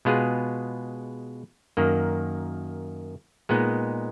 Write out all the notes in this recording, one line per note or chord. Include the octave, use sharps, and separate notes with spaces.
B2 G#3 B3 F4 G#4
F#2 D#3 A#3
A#2 G#3 B3 D#4